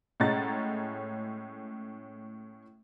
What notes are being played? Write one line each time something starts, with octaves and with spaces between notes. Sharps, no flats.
A2 G#3 C#4 F#5 A#5 A6